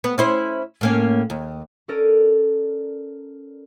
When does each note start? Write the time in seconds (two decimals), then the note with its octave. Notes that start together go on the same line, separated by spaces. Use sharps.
0.04 B3
0.18 C#4 E4 C5
0.81 A2 A#3 C#4
1.30 D#2
1.88 C#4 A4 A#4 D5 D#7